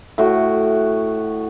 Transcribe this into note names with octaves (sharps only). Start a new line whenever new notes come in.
A2 F#4